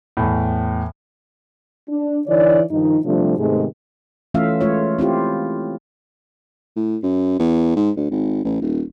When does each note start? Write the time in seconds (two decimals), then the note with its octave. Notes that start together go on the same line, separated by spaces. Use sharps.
0.17 E2 A2
1.89 D4
2.28 D3 E3 D#4 C#5 D5
2.71 G2 D#3 F3 D#4
3.05 C3 F3 G3 A3 D4
3.38 G#2 C3 D#3 G#3 A3 B3
4.34 E3 A3 C#4 F4 E5 F5
4.61 G#3 A3 F4 C#5
4.99 C4 E4 F4 G4
6.77 A2
7.03 F#2
7.40 E2
7.76 G#2
7.97 D2
8.11 G#1
8.45 A1
8.61 D#1